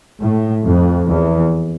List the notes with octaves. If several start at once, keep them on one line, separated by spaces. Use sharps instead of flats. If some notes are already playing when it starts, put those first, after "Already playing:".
A2
F2
E2